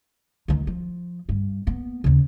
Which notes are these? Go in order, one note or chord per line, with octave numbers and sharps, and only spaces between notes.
D2 D#3
F3
G2
A#3 B3
D#2 C#3